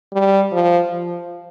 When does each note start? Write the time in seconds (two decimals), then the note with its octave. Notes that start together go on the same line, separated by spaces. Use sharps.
0.14 G3
0.52 F3
0.90 F3